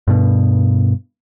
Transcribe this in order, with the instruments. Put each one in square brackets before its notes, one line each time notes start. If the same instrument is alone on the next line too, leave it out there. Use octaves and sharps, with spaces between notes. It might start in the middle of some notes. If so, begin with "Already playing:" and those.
[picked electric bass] G2 B2